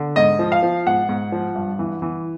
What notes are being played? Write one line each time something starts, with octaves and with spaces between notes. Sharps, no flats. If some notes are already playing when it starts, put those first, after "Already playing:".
Already playing: D3
G#2 D#5
F3
F5
F3
G#2 F#5
G#2
F3
G2
E3
E3